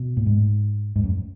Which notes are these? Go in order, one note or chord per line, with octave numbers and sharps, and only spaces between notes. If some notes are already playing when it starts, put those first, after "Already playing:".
Already playing: B2
A2
G#2
G#2
F#2